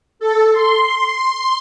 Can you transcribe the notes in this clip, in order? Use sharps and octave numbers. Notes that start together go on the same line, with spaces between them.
A4
C6